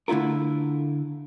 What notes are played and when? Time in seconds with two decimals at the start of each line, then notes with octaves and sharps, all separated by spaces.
0.08 D3 A3 E4 F4 A#4